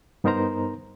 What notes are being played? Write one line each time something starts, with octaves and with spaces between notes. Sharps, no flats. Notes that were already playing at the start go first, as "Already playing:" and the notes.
G2 B3 D#4 A#4 C5 A#5